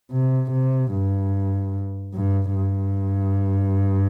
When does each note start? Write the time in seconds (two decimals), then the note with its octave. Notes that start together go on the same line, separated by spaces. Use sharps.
0.12 C3
0.51 C3
0.92 G2
2.15 G2
2.55 G2